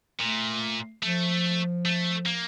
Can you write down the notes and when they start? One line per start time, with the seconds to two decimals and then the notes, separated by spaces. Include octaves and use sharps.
0.21 A#2 A3
1.03 F3 A3
1.86 A3
2.26 A#3